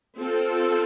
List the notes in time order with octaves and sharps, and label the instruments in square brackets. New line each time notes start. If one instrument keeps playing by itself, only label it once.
[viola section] C4 F4 A4